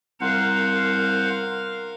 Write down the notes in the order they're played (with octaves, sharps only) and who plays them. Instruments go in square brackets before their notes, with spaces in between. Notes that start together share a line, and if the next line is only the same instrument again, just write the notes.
[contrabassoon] C2 [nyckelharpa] A#4 F5 [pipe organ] C5 F#5